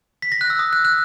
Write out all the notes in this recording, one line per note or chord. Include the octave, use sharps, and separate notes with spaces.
B6
A#6
F#6
E6
D#6
F#6
F#6